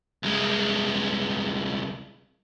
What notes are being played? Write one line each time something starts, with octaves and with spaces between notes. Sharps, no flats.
C2 G#3